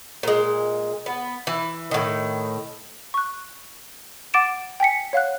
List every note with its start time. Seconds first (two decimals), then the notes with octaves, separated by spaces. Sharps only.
0.23 A#2 G#3
1.06 B3
1.47 E3
1.91 A2 D#3
3.14 C#6 F#6
4.34 F#5 D6 A6 D7 E7
4.80 G5 G#5 B6 C#7
5.13 C#5 F5 F#5 F#6